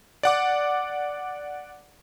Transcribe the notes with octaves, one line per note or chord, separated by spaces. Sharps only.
D5 F#5 D6